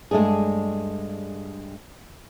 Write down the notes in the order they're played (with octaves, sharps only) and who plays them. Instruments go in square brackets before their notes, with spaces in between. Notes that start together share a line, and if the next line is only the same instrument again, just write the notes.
[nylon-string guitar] G2 G#3 A3 D4 G#4